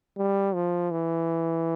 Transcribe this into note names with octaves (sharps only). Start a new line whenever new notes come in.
G3
F3
E3